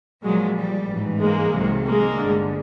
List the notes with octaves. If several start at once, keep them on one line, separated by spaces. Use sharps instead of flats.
A#1 A#2 F3 F#3 G#3
G3
A1 G#2 E3
G#3 A#3
C2 C3 D#3 F#3
G#3 A#3
G1 G2 D3